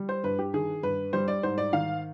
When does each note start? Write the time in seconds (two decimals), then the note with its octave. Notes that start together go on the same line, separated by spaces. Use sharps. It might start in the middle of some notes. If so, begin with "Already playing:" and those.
Already playing: G3
0.09 C5
0.24 G2 B4
0.39 G4
0.54 D#3 G#4
0.83 G2 B4
1.13 G3 C5
1.28 D5
1.43 G#2 C5
1.58 D5
1.73 D#3 F5